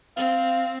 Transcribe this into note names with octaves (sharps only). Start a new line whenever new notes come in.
C4 F5